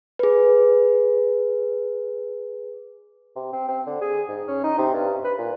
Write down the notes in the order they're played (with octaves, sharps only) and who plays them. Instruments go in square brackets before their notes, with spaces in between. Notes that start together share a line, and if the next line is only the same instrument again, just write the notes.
[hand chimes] G#4 B4
[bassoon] C3
C4
C4
D3
G#4
G#2
C#4
D#4
C3
G2
B4
A#2